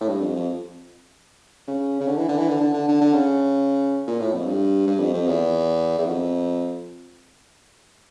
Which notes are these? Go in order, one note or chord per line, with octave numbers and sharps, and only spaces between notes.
A2
G2
F2
F2
C#3
C#3
D3
E3
D3
E3
D3
D3
D3
D3
D3
C#3
A#2
A2
F2
G2
G2
F2
F2
E2
E2
F2